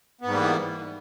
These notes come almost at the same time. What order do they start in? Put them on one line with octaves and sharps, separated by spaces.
B3 G#2 G3 A#3 E3